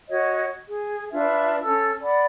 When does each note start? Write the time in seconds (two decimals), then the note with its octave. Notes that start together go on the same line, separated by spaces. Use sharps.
0.09 F#4 C#5 D#5
0.68 G#4
1.11 D4 F4 B4 E5
1.63 C#4 A4 E6
2.03 D5 F#5 B5